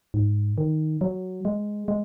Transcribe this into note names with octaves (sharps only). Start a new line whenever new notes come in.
G#2
D#3
F#3
G#3
G#3